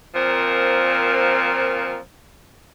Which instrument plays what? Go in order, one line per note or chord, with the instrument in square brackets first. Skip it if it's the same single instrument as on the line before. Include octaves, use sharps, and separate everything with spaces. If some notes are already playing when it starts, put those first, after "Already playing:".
[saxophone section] A#2 F3 C4 A#4